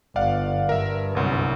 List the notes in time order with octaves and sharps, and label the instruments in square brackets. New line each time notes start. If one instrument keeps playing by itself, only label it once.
[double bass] G1 [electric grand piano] D5 F5 F#5
[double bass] G2 [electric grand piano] A#4 E5
[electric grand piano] G1 C2 F#2